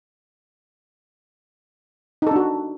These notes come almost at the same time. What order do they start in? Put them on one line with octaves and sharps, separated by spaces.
D#4 A4 D4 F#4